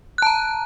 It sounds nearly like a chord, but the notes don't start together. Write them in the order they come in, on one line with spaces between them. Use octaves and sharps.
F#6 A5 A#5